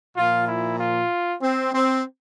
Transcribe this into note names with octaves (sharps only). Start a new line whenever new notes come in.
A#2 F3 F4
E4
F4
C4
C4